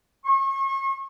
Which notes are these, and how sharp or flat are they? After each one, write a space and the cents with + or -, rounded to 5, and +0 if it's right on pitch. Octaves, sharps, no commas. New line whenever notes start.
C#6 -35